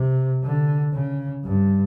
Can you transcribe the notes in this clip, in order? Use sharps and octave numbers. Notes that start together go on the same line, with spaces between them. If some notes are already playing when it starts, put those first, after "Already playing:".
Already playing: C3
D3
C#3
G2